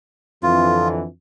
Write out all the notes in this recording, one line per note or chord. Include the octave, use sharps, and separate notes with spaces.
F2 D3 E3 F4